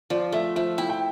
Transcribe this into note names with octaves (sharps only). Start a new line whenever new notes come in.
F3 D5
A3 E5
F3 E5
E4 G5
G5